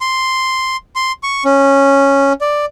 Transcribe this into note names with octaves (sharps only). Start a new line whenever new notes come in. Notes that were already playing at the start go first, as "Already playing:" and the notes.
C6
C6
C#6
C#4
D5